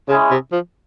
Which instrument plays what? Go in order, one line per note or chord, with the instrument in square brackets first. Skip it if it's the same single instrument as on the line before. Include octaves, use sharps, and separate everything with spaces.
[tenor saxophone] C#3 [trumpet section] G#3 C#4 E4 G#4
[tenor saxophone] C3
F3